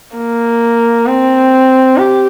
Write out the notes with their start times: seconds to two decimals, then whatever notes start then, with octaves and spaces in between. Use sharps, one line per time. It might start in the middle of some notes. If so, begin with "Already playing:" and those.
0.16 A#3
1.07 C4
1.98 G4